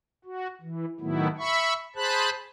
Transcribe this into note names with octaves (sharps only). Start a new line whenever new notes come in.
F#4
E3
A2 D#3 F#3 A3 B3 E4
E5 B5 C#6
G#4 C5 A5 B5 F#6